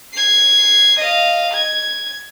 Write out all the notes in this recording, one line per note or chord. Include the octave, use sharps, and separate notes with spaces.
G#6 C7
D#5 F5
G#6